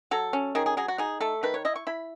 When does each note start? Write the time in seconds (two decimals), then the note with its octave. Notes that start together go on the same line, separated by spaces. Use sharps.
0.11 F#3 A4
0.33 C#4
0.55 D#3 G#4
0.66 G#4
0.77 F#3 G#4
0.88 F#4
0.98 D#4 G#4
1.21 A3 A4
1.43 D#3 B4
1.54 C#5
1.65 E4 D#5
1.76 C#6
1.87 E4 B5